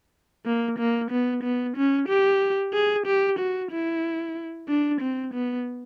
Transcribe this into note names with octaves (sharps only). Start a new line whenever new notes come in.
A#3
A#3
B3
B3
C#4
G4
G#4
G4
F#4
E4
D4
C4
B3